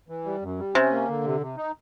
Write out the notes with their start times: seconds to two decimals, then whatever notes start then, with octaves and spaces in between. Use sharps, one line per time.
0.09 E3
0.25 G3
0.42 F#2
0.58 G3
0.75 C3 C#4
0.91 A#3
1.08 D3
1.24 C3
1.41 C3
1.57 D#4